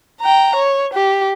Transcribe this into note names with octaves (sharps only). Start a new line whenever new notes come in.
G5 A#5
C#5
G4